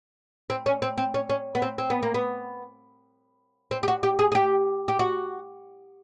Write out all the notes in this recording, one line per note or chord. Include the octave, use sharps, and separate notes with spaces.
C4
C#4
C4
C4
C#4
C#4
B3
C4
C4
B3
A#3
B3
C4
G4
F#4
G4
G#4
G#4
G4
G4
F#4